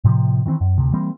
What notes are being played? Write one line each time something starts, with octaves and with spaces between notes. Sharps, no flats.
A2 C3 D#3 F3
D#3 E3 A#3 C4
F#2
D2 C3
E3 G3 A#3 C4